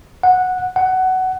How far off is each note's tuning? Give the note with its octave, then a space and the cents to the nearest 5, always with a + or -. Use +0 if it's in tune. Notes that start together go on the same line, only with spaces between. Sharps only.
F#5 -10
F#5 +15